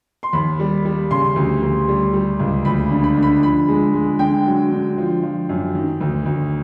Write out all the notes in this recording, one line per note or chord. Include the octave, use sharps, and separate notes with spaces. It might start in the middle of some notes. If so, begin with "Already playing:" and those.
C6
D#2 B5
G3
G3
C#3 C6
D2
D2
G3
G3
C#2
D2 B5
D3
B5
D3
B5
F3 B5
G#3
G#3
D3 G5
F#3
D3
F3
F3
F#2
D#3
D2
D2